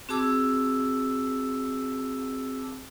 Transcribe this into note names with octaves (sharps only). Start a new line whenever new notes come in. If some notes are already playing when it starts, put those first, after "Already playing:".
C4 F#4 G#4 A5 D6 E6